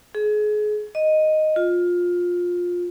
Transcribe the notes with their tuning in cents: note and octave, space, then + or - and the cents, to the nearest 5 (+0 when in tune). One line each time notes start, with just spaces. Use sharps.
G#4 +30
D#5 -5
F4 +15